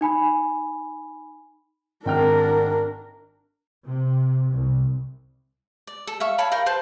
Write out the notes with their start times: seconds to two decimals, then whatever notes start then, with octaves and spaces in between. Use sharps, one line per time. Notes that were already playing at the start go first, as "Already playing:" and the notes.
0.01 D#4 G#5 B5
2.06 G#1 D4 A#4 G5 F6
3.88 C3
4.54 C2
5.87 D5
6.07 A4
6.20 E5 F5 C#6
6.38 C#5 F5 A5 B5
6.52 A#4 F5 G5
6.66 B4 C5 A5